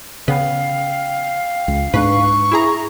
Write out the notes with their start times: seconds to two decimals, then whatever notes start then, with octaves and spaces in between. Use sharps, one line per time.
0.28 C#3 B3 F5 G5
1.68 C#2
1.94 G#2 B3 D4 B4 C#6
2.52 E4 G#4 A#5